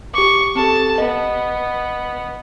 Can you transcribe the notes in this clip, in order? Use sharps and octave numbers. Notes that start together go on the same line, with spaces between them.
G4 C#6 D6
C4 G4 A4 A5
B3 D#5